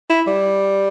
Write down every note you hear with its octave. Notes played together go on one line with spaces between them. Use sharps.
E4
G3